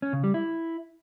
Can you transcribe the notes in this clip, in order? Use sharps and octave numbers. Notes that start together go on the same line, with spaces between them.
C#4
C#3
G3
E4